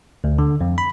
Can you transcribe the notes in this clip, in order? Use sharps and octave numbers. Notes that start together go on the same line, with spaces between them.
D2
D3
F2
B5